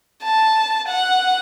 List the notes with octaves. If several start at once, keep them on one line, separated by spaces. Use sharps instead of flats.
A5
F#5